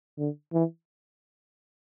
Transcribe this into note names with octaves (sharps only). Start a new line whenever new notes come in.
D3
E3